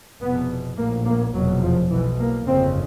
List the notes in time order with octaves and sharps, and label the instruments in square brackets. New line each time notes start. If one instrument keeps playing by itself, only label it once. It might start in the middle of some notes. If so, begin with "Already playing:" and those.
[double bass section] F1 E2 B2 B3
A#1 A2 A#3
A#3
F1 E2 B2 F#3
F3
B1 B2 E3
A#3
G1 F2 C#3 C4